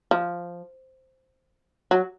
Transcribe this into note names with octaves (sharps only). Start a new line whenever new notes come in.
F3
F#3